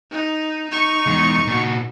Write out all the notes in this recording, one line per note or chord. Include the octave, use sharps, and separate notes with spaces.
D#4
D#4 C#6
E2 G#3
A#2 F#4